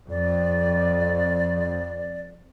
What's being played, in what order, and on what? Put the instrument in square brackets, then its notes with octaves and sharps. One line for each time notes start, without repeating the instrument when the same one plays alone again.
[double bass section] F2 [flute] D5